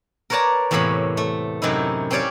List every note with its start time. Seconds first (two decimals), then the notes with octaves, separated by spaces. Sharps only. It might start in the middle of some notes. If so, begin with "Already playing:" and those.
0.30 A#4 B4 C#5 D5 A5 A#5
0.71 E2 A2 C3 A#3 C#5 B5
1.17 A3
1.62 F#2 C3 F#3 D#4 E4
2.11 C4 C#4 G4 C#5 D5 F5